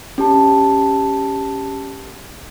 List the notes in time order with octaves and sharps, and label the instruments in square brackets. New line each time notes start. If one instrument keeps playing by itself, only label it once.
[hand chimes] C#4 G4 A5